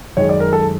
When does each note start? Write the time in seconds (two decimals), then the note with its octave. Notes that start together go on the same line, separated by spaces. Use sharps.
0.17 F#2 D#3 G#3 C#5
0.29 D5
0.40 A#4
0.53 A4